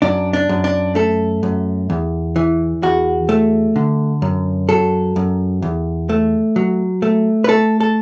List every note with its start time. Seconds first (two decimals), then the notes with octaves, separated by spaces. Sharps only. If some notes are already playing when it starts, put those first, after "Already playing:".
0.02 F#2 D4
0.33 D4
0.49 F#2
0.64 D4
0.95 A3 A4
1.43 F#2
1.90 E2
2.36 E3
2.83 E2 F#4
3.29 A3
3.76 D3
4.22 F#2
4.69 F#3 A4
5.16 F#2
5.62 E2
6.09 A3
6.56 F#3
7.02 A3
7.44 B4
7.49 A3 A4
7.80 A4